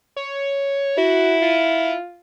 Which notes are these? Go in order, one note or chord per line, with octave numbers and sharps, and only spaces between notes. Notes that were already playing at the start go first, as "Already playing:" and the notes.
C#5
E4 F#4
F4